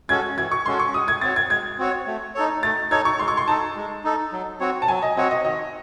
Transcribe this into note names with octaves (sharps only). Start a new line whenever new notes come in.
G#3 C#4 F#4 A4 G#6
E3 G#6
C#6
G#3 C#4 F#4 A4 C6
C#6
G#3 D#6
G#6
C4 F#4 C#5 A6
G#6
G#3 G#6
C4 F#4 C#5
A3
D#4 A4 C#5
A3 A6
D#4 A4 C#5 G#6
C#6
G#3 C6
C#6
C6
D#4 A4 A5
G#3
D#4 A4
F#3
C4 F#4 C#5
A5
F#3 G#5
D#5
C4 F#4 C#5 D#5
D#5
D#3 D#5